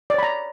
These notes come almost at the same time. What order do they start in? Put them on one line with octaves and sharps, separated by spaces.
D5 C#5 B5 A#5